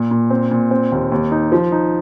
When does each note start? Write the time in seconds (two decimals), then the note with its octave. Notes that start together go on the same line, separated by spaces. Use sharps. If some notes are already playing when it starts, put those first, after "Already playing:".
Already playing: A#2
0.11 A#2
0.30 C4
0.51 A#2
0.71 C4
0.92 D#2
1.12 D#2
1.32 D#4
1.52 F3
1.72 D#4